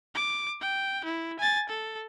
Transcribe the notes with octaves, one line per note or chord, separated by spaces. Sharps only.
D6
G5
E4
G#5 A6
A4